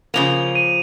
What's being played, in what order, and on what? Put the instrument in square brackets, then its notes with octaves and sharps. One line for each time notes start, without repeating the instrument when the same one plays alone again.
[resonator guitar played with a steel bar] C#3 F3 A#3 [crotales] F7
[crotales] D#7